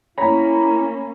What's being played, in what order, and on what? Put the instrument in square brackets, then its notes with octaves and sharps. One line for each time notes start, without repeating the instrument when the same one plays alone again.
[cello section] A#3 C#4 [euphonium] E4 [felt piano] C#5 A#5 B5